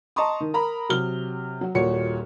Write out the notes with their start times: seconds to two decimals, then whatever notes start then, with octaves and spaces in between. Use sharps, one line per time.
0.16 D#5 A5 A#5 C6 C#6 D#6
0.40 D#3
0.54 A#4 A#5 B5
0.89 C3 F#3 F6 G7
1.61 F#3 F#4
1.75 D#1 A#2 F#4 C#5 C#7